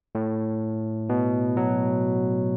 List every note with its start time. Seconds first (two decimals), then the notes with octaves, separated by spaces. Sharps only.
0.15 A2
1.09 B2
1.57 F#3